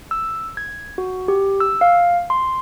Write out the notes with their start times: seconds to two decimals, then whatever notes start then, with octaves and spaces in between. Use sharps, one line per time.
0.11 E6
0.57 G#6
0.98 F#4
1.28 G4
1.60 E6
1.81 F5
2.30 C6